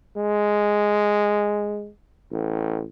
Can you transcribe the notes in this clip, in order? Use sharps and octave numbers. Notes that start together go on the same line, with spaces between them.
G#3
A1